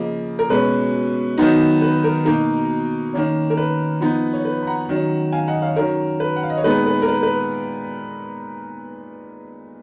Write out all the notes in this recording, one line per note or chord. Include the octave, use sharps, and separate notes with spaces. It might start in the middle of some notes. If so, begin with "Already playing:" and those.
Already playing: C#3 F3 A#3 D#5
A#4
B2 G#3 C#4 B4
D#3 F#3 B3 D#4
B4
A#4
B2 A#3 D#4 A#4
D#3 A#3 C#4
A#4
B4
F3 B3 D#4
C#5
B4
B5
F#5 A#5
D#3 F#3 C#4
F5 G#5
D#5 F#5
C#5 F5
D#3 F#3 C#4 A#4 C#5
B4
F#5
F5
D#5
C#5
A#2 G#3 B3 D#4 B4
B4
A#4
B4
B4